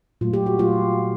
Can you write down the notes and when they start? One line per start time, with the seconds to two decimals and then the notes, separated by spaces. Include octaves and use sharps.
0.21 A#2 F#3 A3 F4
0.33 G4
0.46 F#4
0.59 A#2 F#3 A3 F4